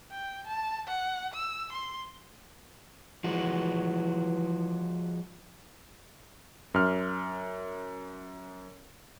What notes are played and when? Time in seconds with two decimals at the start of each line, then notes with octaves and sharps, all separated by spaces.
0.11 G5
0.47 A5
0.87 F#5
1.34 E6
1.72 C6
3.24 E3 F3 G#3 F#4
6.74 F#2 F6